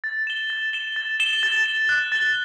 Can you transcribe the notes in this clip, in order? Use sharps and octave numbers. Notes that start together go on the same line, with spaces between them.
A6
E7 G7
A6
E7 G7
A6
E7 G7
A6
E7 G7
F#6
A6 E7 G7